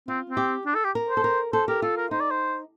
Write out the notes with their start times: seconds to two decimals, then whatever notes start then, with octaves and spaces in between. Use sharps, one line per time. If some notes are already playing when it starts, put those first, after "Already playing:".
0.08 C4 F4
0.30 C4
0.37 G4
0.66 D4
0.75 A4
0.85 G4
0.95 A#4
1.09 C5
1.17 A4
1.24 A#4
1.53 A4 C5
1.68 G4 A#4
1.82 F4 A4
1.97 A#4
2.11 D#4 C5
2.21 D5
2.31 C5